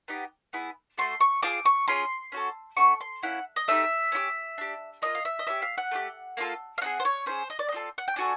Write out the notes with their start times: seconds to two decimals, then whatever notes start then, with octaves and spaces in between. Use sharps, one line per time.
0.08 B3 D#4 G4
0.53 B3 E4 G#4
0.98 A3 D4 F#4 A4 C6
1.20 C#6
1.42 C4 F4 G#4 D6
1.65 C#6
1.88 C#4 F4 G#4 C6
2.32 C#4 F#4 A4
2.77 A3 C#4 F#4 C#6
3.01 C6
3.23 A#3 C#4 E4 F#5
3.56 D#5
3.68 A3 C4 D#4 G4 E5
4.12 C#4 E4 G4
4.58 D4 G4
5.02 A#3 D4 F4 D#5
5.15 F5
5.25 E5
5.39 D#5
5.47 C#4 E4 G4 E5
5.62 F5
5.78 F#5
5.91 A3 D4 G4
6.37 A#3 D4 F4 A4
6.78 F5
6.81 C4 D#4 G#4 F#5
6.99 C5
7.05 C#5
7.26 C#4 E4 G#4 C5
7.50 D#5
7.59 D5
7.69 D#5
7.72 C4 F4 A4
7.98 F#5
8.08 G5
8.16 D4 F#4 A4 G#5